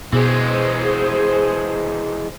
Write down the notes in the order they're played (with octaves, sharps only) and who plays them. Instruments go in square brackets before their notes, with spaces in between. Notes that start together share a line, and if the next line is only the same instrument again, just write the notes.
[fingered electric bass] B2 [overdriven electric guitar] E3 G#3 [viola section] G#4 C5